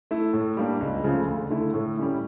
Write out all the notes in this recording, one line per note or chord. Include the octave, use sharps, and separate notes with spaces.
A3 E4
A2
G3 A#3 D4
C#2
C#3 F3 A3
D2
D3 A3 E4
A2
G3 C#4 E4